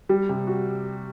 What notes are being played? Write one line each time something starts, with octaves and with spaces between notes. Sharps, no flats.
G3
C3
F#4